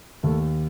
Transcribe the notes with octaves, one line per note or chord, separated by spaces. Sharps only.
D#2 A3